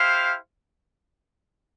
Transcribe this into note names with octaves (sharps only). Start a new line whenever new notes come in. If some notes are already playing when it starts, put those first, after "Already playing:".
Already playing: E4 G4 C5 F5